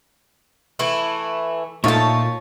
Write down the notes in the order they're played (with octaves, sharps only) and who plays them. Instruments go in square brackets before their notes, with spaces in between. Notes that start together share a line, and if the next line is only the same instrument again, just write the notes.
[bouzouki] E3 A3 E4
[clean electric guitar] A#2 [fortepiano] A3 D#4 F4 [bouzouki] C#5 A5